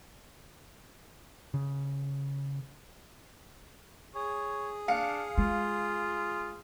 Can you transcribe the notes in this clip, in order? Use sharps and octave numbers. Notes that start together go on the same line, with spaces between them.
C#3
G#4 C#5
D4 F5 C#7
G#3 F4